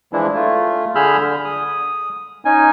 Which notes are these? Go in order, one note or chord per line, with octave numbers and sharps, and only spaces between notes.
E3 F3 G#3 D4 E4
A3 F4
D3 G#4 B5 E6 F6 G6
D3
D#6
C#4 D#4 G#5